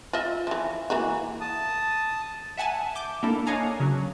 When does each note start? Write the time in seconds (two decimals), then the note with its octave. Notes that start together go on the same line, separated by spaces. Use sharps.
0.13 F4 D#5 E5
0.47 E3 F3
0.90 E3 A#3 F#4
1.41 A5 D#6
2.57 E5 F#5 G#5 A5
2.95 D6 G6
3.23 A#3 D4 E4 A4
3.47 D4 C#5 D#5 F5 G#5 A#5
3.80 C#3 F#3